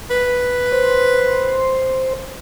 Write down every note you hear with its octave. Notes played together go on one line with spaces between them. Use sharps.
B4
C5